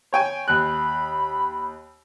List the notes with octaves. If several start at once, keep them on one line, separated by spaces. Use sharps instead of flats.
C#5 G5 G#5
D#2 B5 F#6